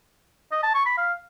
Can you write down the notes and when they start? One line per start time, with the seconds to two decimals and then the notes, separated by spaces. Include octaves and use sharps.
0.51 D#5
0.63 A5
0.74 C#6
0.86 B5
0.97 F5